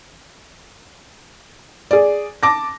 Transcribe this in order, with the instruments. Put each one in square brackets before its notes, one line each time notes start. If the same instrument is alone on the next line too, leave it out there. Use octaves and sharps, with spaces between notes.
[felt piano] G#4 D5
A5 D6 A#6